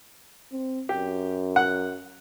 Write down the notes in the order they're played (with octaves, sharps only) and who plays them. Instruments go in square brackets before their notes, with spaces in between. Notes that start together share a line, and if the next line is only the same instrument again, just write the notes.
[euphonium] C4
[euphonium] F#2 [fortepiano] G4
[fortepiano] F#5